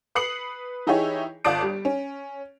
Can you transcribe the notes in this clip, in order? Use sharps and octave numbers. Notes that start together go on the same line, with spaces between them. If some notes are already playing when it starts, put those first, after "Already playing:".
B4 D#6 C7 C#7 F#7
E3 D#4 E4 G4 G#4 C#5
G1 F4 D5 A5 D#6 D7
G3
C#4